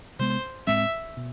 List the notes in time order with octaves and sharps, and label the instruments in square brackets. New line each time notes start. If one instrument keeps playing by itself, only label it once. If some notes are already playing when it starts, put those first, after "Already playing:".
[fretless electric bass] C3 G#3 B3 [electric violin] C5
[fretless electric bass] A2 G#3 C4 [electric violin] E5
[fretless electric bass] B2